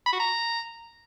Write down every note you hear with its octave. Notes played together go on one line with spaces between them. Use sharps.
B5
F#4
A#5